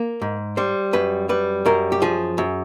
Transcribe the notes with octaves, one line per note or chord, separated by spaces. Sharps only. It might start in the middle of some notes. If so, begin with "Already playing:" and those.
Already playing: A#3
G#2
G3 C5
F#2 B4
G3 B4
F#2 A#4
G4
F3 G#4
F#2